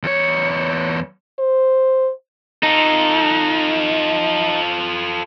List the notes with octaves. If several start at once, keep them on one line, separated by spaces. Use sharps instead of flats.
E2 C#5
C5
D#4 F4 A4